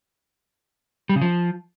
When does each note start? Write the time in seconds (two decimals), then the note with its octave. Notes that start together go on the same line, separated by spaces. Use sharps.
1.09 G3
1.15 C#3
1.22 F3